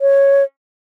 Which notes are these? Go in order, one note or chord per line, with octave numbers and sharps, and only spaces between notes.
C#5